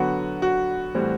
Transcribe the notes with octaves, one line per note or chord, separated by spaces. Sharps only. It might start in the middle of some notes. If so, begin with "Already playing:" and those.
Already playing: D3 F#3 B3 F#4
F#4
A2 E3 G3 C4